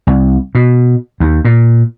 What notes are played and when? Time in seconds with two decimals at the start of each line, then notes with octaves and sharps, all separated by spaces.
0.07 C2
0.55 B2
1.20 D#2
1.45 A#2